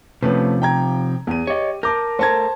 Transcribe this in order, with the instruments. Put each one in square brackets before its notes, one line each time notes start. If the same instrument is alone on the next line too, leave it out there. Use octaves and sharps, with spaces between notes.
[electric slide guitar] C3 F3 [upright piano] A3 C#4 B4
[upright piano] G5 A#5 G#6
E2 D#7
[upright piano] G4 [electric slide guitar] C#5 D#5
[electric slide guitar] A#4 [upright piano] A5 D6 G6
[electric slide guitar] A3 A#4 [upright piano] C5 A5 G#6